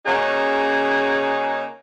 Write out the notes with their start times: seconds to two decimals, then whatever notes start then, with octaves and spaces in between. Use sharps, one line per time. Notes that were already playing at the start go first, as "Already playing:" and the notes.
0.06 C#3 A#3 C#4 D#4 F#4 G#4